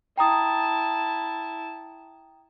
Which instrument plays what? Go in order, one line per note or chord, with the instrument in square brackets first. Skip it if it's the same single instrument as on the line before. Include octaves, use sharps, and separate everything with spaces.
[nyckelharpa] E4 A5 [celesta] G5 A#5 D#6